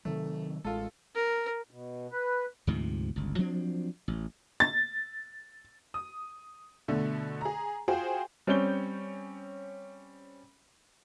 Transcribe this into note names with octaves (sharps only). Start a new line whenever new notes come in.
C3 D#3 F#3 A3
A1 G#3 F4 A4
A#4
B2
B4
D2 G#2 C3 F3
G1 C#2
F3 F#3 C4 D4
A1
A6
D#6
B2 D3 A3
G#4 A#5
F4 F#4 G#4 C5 G5
G3 C4 C#4 C#5 G6 G7